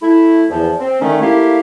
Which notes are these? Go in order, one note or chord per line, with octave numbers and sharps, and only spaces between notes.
A3 E4
E2 F3
C4
D3 D#3 A3 C#4
A3 A#3 E4 G4 F5